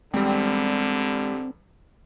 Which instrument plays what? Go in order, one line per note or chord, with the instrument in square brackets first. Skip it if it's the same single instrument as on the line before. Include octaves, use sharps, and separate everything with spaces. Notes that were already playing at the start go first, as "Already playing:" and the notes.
[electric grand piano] E2 G3 [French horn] D3 [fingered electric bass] G#3 [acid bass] C4